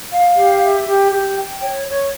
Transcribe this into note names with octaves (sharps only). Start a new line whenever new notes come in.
F5
G4
E5
G4
G4
G5
C#5
C#5